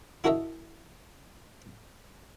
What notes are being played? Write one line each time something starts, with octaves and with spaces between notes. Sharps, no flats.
E4 F#4 A4 A#4 D#5 E5